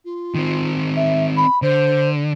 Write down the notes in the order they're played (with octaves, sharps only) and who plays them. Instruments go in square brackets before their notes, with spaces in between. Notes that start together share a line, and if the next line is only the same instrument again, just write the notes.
[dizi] F4
[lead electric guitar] D#3 C4
[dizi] E5
B5
[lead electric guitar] D3 [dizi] C5